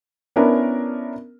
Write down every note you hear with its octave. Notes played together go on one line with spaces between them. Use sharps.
B3 C#4 D4 E4 A#4